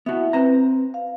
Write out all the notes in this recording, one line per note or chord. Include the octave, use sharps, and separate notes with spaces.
B3 E4 F#4 E5
C4 B4 A#5
F5